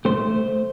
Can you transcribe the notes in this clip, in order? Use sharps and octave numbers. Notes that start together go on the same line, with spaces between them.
A3 C5